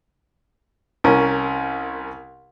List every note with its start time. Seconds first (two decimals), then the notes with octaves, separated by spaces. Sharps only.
1.04 C2 C#4 A#4